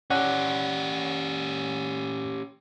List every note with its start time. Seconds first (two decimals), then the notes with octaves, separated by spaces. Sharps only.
0.10 C#4 G4 C#5 D5 F#5